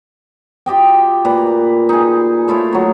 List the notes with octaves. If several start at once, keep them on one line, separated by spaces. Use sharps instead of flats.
F4 G4 D#5 G5
A#2 B4 A#5
D#4 G#4
A3 E4 F4 C#5
F#3 D#4